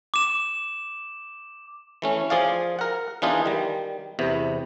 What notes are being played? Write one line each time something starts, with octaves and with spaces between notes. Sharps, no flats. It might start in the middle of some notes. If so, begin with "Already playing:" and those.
D6 E7
E3 A3 C#4
F3 G#4 D5 F5
A#4 F#5
E3 B3 D4 D#4 F4 G#4
D#3 G3
E2 C3 B3